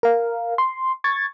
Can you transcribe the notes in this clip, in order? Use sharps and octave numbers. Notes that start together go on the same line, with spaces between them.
A#4 F5
C6
C#6 G#6 A6